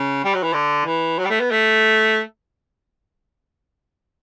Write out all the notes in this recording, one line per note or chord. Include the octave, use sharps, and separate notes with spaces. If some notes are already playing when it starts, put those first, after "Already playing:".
Already playing: C#3
G3
F#3
E3
D3
E3
F#3
G3
A3
B3
A3